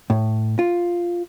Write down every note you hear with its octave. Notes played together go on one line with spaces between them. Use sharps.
A2
F4